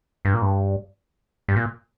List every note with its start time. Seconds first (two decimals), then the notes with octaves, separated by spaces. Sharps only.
0.25 G2
0.34 A#2
0.42 G2
1.48 G2
1.56 A#2